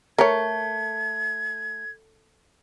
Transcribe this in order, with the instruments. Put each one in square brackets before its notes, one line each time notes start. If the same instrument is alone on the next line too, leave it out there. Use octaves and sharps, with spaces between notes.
[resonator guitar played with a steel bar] A3 [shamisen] A#4 C#5 [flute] G#6